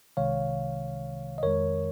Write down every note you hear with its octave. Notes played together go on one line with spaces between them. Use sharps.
C2 C3 D#3 G#3 C#5 F5
D#5
F2 D#3 G#3 A#4 C#5